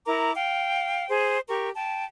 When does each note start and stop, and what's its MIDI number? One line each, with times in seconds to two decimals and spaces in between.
0.06 0.33 64
0.06 0.33 70
0.06 0.33 82
0.06 0.33 86
0.35 1.07 77
0.35 1.07 79
1.08 1.38 68
1.08 1.38 72
1.48 1.70 67
1.48 1.70 70
1.48 1.70 85
1.76 2.04 79
1.76 2.04 81